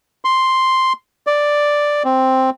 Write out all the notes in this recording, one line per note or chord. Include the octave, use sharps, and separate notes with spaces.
C6
D5
C4